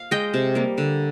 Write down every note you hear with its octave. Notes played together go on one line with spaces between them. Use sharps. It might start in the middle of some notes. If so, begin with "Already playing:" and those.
Already playing: F5
G#3 D#5 G5
C3
G3 A#3
D3